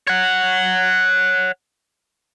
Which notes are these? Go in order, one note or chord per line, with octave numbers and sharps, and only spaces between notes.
C#5 F#5